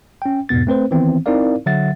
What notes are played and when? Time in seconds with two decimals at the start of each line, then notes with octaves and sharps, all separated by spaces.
0.22 C#4 G5
0.49 E2 G#2 B2 B3 A6
0.67 A3 C4 B4 C5
0.91 D#3 E3 B3 C4
1.26 C4 D#4 E4 A#4 D5 F5
1.66 D3 F#3 E5 F#5 A6